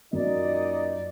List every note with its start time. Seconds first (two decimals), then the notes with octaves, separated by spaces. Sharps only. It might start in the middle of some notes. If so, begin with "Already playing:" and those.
0.13 F#2 A#2 D#4 D5 D#5